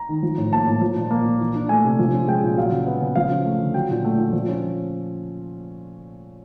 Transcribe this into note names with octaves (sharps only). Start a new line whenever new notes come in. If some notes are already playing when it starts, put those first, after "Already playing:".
Already playing: A#5
D#3
F3
A2
A#3 A5
A2
F3
A#2
A#3
A#2
E3
D4
A3 G#5
C3
F3
C#4
G#3 G5
A#2
F#3 F5
C#3
B3
C#3
F3 F5
C#4
A3
D3
F#3 G5
A#2
A3
A#2
F3
C#4